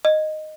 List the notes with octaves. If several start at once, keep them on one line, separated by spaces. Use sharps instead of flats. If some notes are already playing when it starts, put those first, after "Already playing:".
D#5